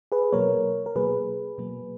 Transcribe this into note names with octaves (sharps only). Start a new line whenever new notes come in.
G#4 B4
B2 F#3 A#3 A#4 C#5
A#4
B2 F#3 A#3 G#4 B4
B2 F#3 A#3